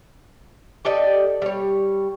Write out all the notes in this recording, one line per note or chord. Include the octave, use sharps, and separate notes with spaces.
G4 A4 D5 D#5
G3 C#5